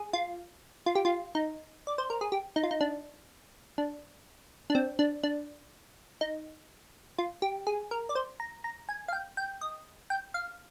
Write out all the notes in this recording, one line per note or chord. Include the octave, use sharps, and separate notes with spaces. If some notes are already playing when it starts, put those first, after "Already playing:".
Already playing: G#4
F4
F4
G4
F4
D#4
D5
C5
A#4
G#4
G4
D#4
F4
D#4
D4
D4
D4
C4
D4
D4
D#4
F4
G4
G#4
A#4
D5
C5
A#5
A#5
G#5
F5
G5
G5
D#5
G5
F5